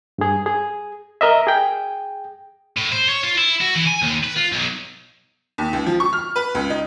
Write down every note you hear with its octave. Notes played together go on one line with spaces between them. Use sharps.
G2 G#4
G#4
A#4 D#5 E5
G#4 G5
A2
C5
C#5
F4
E4
F#4
E3
G#5
D#2
B4
F4
B1
D#2
C#2
F3
C#6
F6
B4
C#2
D#4